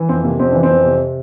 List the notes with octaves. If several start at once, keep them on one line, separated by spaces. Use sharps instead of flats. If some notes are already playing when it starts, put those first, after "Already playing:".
Already playing: E3
F2 C4
C3 A#3
F2 C4
E3 D4
C4
F2
C3